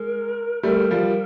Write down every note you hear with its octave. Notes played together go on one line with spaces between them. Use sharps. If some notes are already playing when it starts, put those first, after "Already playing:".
Already playing: G#3 A#4
G3 A3 A#4
F3 G3